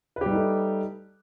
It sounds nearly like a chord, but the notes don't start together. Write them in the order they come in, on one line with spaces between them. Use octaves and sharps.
B4 G4 G3 D#4 A3